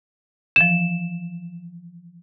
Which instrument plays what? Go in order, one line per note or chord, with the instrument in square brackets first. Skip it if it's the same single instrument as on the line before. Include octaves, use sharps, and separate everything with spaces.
[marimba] E3 F3 [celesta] E7